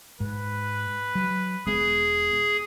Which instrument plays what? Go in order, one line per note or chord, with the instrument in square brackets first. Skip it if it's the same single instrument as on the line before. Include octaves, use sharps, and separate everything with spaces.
[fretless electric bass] G#2 [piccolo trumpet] B4
[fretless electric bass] F#3
[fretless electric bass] E1 G#3 B3 [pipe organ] G#4